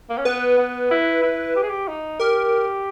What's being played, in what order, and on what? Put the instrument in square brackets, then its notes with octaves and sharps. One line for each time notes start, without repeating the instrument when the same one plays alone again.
[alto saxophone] A#3
C#4
[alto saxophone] B3 [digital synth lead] B4
[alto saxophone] B3
E4
E4
G4
G#4
G4
D#4
[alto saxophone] G4 [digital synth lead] A#4